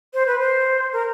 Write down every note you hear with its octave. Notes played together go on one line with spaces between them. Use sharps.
C5
B4
C5
A#4